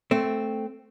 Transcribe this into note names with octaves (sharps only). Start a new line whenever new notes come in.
A3 C4